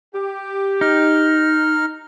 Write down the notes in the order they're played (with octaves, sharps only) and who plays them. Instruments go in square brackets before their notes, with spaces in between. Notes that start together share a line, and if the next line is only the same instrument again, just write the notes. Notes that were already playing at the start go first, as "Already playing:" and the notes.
[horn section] G4
[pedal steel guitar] D#4 [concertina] F6